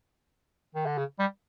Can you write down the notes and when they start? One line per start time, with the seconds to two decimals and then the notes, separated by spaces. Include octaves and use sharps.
0.75 D#3
0.86 D3
0.98 C#3
1.19 G3